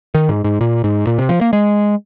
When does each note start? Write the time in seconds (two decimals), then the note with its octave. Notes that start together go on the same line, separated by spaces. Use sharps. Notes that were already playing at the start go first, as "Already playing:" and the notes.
0.14 D#3
0.29 G#2
0.44 G#2
0.61 A#2
0.84 G#2
1.07 A#2
1.19 C3
1.29 F3
1.41 A#3
1.53 G#3